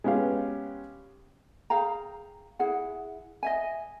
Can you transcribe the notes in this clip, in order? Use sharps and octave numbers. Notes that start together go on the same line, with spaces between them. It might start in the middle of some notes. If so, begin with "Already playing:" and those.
G#3 B3 C#4 G4 F5
G#4 F5 G5 A#5
E4 G#4 F#5
D#5 E5 G#5